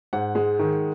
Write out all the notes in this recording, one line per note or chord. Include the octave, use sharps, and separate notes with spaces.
G#2 F#5
G#3
D#3